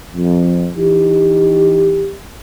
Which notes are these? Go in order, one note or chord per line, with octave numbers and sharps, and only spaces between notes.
F2
E3 D#4 G4